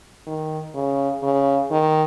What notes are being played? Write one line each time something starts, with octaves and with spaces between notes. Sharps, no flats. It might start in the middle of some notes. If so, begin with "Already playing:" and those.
D#3
C#3
C#3
D#3